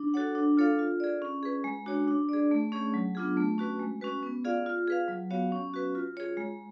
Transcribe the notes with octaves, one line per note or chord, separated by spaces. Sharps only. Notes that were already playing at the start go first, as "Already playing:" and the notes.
Already playing: D4
F#4 A4 C#5 F#5
D4
F4 A4 C#5 F5
F4
G#4 D5
C#4
G#4 B4
G#3
D4 F#4 C#5
D4
G#4 D5
A3
C#4 G#4 C#5
F#3
B3 D4 F4 G#4
A3
C#4 F#4 B4
G#3
C#4 F#4 B4
B3
F4 G#4 D5 F5
F4
G#4 B4 F5
F#3
B3 F#4 C#5 F5
C#4
F#4 B4
F4
G#4 C#5
G#3